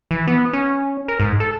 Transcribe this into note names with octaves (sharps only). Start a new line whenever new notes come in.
E3
B3
C#4
A#4
G#2
A4